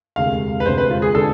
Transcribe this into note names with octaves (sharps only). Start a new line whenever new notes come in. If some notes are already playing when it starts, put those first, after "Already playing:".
E1 D2 C3 G#3 F5
B4
E1 D2 C3 G#3 C5
B4
F4
G#4
D3 G#3 D4 A4